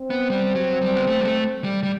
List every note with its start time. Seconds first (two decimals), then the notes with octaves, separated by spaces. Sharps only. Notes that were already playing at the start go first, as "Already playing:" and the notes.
Already playing: C4
0.10 B3
0.30 G3
0.55 F#3
0.82 G3
0.96 B3
1.07 A3
1.20 G3
1.25 A3
1.64 G3
1.83 G3